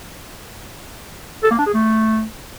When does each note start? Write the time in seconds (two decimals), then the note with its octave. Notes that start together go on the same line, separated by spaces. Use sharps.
1.44 A4
1.51 A#3
1.59 D4
1.66 G#4
1.74 A3